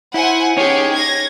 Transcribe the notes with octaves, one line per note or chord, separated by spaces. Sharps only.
E4 C5 F#5 G#5
C#4 D#4 G4 G#4 C#5
G#6 A#6